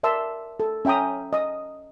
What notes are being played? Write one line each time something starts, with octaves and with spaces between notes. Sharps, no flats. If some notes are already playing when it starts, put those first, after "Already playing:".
A#4 D5 E5 A5 C6 E6
A4
C#4 E5 G5 A#5 D#6
D#5 D#6